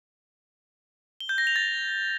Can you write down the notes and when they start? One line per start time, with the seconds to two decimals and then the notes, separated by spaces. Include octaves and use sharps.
1.20 G7
1.29 G6
1.38 A#6
1.47 F7
1.56 A6